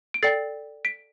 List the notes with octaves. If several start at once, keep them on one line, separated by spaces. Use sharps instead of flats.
D7
A4 D5 G5 A6 C7
B6 D7